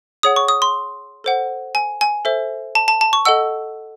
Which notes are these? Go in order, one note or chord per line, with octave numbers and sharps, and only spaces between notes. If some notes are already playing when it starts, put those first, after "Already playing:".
G#4 C#5 F#5 D#6
C#6
D#6
C6
A4 C5 F#5
G#5
G#5
A4 C5 E5
A5
A5
A5
C#6
A4 D#5 F#5 E6